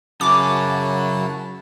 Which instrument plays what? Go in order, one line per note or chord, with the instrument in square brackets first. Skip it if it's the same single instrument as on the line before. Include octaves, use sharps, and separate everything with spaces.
[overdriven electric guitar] F#2 C#4 [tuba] C#3 [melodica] E4 F#4 A5 [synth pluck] D6